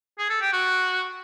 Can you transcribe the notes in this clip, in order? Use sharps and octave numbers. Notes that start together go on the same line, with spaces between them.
G#4
A4
G4
F#4